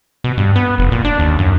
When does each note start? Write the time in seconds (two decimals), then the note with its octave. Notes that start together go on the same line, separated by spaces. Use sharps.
0.24 B2
0.38 G2
0.56 B3
0.78 F1
0.92 A#2
1.05 D4
1.19 D#2
1.39 F#2